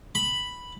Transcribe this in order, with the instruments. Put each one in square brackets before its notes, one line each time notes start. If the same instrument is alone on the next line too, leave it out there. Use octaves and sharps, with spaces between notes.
[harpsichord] B5